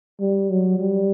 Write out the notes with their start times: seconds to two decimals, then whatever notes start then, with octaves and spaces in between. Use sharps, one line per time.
0.20 G3
0.50 F#3
0.79 G3